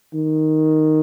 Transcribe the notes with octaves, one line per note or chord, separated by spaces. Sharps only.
D#3